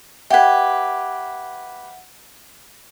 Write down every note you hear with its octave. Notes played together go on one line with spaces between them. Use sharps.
G4 B4 E5 F#5 G#6